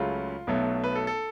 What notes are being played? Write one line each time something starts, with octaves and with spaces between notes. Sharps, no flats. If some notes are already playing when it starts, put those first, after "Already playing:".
Already playing: C#2 C#3 F#3 A3 F4
B1 B2 F#3 A3
B4
A4
A4